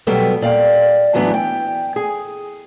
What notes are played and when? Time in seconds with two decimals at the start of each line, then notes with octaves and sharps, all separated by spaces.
0.07 B2 F#3 G3 B3 A4 G5
0.41 A#2 D5 F5 G5
1.14 A2 E3 F#3 B3 D4
1.34 G5
1.96 G#4